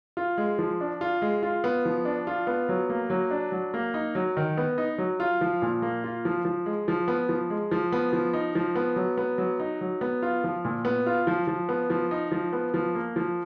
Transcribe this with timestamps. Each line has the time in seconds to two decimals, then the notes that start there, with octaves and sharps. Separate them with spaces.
0.17 F4
0.38 G#3
0.58 F3
0.81 D4
1.01 F4
1.22 G#3
1.43 F4
1.64 B3
1.85 F3
2.05 D4
2.27 F4
2.47 B3
2.69 F#3
2.90 A#3
3.10 F#3
3.31 D4
3.52 F#3
3.74 A#3
3.94 D#4
4.15 F#3
4.37 D#3
4.57 B3
4.78 D#4
4.98 F#3
5.20 F4
5.41 F3
5.62 A#2
5.82 A#3
6.04 F4
6.25 F3
6.45 F3
6.66 G#3
6.88 F3
7.08 B3
7.29 F3
7.50 G#3
7.71 F3
7.92 B3
8.13 F3
8.34 D#4
8.55 F3
8.75 B3
8.96 F#3
9.17 B3
9.38 F#3
9.60 D#4
9.81 F#3
10.01 B3
10.22 F4
10.44 F3
10.65 A#2
10.85 B3
11.06 F4
11.27 F3
11.47 F3
11.69 B3
11.90 F3
12.11 D#4
12.32 F3
12.53 B3
12.74 F3
12.95 A#3
13.16 F3